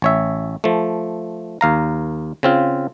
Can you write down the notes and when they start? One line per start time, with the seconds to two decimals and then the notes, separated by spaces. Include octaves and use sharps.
0.02 A1 C#5 E5
0.64 F3 A3
1.61 D#2 F5 A#5
2.43 C#3 C4 F4